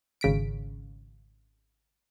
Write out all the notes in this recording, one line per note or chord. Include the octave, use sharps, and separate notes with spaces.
G#1 C#3 B6 D7